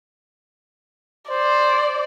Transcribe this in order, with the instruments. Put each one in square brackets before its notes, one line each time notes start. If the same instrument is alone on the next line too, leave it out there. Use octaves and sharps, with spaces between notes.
[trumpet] C5 [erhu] D5